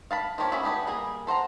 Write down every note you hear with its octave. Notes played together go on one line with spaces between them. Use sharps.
F5 A5 B5
F3 A#3 D4 G4 C#5
C#4 F#4 G#4 B4 E5
B3 D4 G4 G#4 B4
G3 A#3 G#4
A4 C5 F#5 A#5